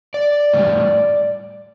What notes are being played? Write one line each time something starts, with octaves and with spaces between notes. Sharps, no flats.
D5
A2 E3 G3